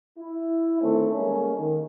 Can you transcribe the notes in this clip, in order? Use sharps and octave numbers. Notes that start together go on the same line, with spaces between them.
E4
D3 D#3 A3 C4 C#4
G3 G#3 A#3 C#4
D#3